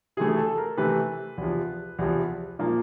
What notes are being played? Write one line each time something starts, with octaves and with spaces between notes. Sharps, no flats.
C3 E3 A3 G#4
G#4
A4
A#4
C3 E3 A3 B4
E2 C3 F3
E2 C3 F3
A#2 F3 A#3